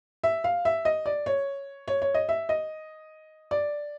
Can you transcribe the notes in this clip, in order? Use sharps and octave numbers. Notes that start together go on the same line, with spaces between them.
E5
F5
E5
D#5
D5
C#5
C#5
C#5
D#5
E5
D#5
D5